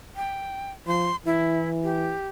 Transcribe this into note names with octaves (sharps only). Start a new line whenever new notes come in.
G5
F3 C6
E3 E4
G4